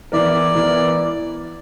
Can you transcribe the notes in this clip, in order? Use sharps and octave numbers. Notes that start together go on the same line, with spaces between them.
E3 B3 E4 A#4 D5
E3 B3 E4 A#4